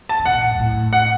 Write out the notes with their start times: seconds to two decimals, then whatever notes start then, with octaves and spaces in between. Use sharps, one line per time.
0.09 A5
0.19 C#3
0.25 C3 F#5
0.34 A#2
0.43 A2
0.51 F#2
0.59 A2
0.93 F#5